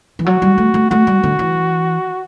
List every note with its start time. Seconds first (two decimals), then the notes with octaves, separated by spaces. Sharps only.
0.19 E3
0.26 F#3 F#4
0.42 G3
0.58 A3
0.74 A3
0.91 A3 F#4
1.07 G3
1.23 D3
1.39 E3